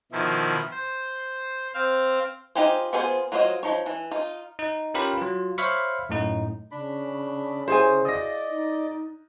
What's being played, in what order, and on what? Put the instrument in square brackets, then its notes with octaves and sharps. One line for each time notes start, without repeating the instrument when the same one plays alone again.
[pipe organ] B2 D#3 F3 E4
C5
C4 C5 F5
[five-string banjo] D#4 F4 G4 G#4 C5
B3 F4 G#4 B4 C5
F#3 F4 C5 C#5 D#5
F3 D#4 C#5
E3
D#4 F4
[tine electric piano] D#4
C#4 F4 G4 A#4 B4 B5
F#3 F4
C5 C#5 E5 F5 B5 C#6
F#2 A2 D#4
[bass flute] C#3 [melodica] D4 B5
[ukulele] E4 G#4 G#5 [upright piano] C5
[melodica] D5 D#5 [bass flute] F5 [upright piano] D#6 A#6
[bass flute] D#4